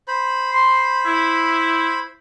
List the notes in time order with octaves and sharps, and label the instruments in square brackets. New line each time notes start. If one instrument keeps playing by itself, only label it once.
[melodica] C5 B5
[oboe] C6
E4